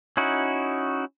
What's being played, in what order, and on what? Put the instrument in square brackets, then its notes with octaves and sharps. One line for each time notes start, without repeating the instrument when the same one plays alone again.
[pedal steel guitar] C#4 D#4 E4 F#4